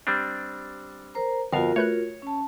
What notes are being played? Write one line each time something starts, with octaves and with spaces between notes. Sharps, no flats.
G3 C4 D4
A#4 C5 A#5
G1 F2 B3 F4 F#4 A#4 F5 A5
A3 B4 C#5 F#6
C#4 A5